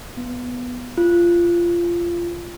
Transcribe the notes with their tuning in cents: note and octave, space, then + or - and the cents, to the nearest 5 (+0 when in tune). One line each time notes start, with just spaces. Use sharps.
B3 +0
F4 -20